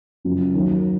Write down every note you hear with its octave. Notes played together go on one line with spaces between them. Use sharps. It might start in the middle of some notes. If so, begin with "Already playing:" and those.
F#2 C#3 F3
D#2 D#3 F#3